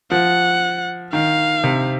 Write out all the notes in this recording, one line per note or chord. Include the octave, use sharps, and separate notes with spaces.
F3 F#5
D#3 F5
C3